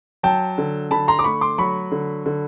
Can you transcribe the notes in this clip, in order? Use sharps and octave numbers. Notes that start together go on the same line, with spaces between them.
F#3 G5 A5
D3
D3 A5 B5
A#5 C6
D6
A3 B5 C#6
C6 D6
F#3 B5 C#6
D3
D3